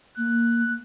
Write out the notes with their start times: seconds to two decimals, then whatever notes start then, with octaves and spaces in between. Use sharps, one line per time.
0.17 A#3 F#6